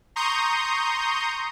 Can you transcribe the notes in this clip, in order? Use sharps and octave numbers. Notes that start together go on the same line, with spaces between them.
A#5 C6 C#6 D#6 G6